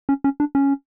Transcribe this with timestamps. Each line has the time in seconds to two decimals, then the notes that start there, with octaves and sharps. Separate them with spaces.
0.09 C#4
0.24 C#4
0.40 D4
0.55 C#4